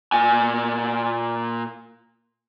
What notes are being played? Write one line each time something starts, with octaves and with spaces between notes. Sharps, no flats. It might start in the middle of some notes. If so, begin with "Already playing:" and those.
A#2 G#5